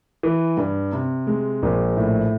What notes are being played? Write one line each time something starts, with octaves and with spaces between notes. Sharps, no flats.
E3
G2
C3
G#3
A#1
A2